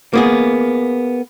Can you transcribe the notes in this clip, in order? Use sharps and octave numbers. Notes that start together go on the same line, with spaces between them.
A#3 B3 G#4